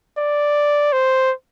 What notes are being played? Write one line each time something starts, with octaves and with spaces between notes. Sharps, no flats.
D5
C5